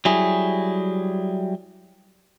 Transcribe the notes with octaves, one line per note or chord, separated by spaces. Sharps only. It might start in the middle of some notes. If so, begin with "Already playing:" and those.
F#3 G3 E4 G#4